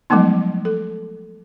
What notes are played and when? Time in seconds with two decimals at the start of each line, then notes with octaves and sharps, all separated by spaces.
0.10 F3 F#3 G#3 A3 B3 D#4
0.65 A4